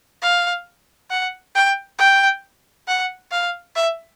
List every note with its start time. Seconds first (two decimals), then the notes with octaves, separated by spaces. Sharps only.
0.22 F5
1.10 F#5
1.55 G5
1.99 G5
2.88 F#5
3.32 F5
3.76 E5